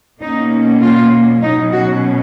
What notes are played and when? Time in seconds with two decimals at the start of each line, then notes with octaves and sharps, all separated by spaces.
0.21 B2 A#3 C#4 D#4
0.82 F4
1.42 B2 F#3 C#4 D#4
1.72 F#4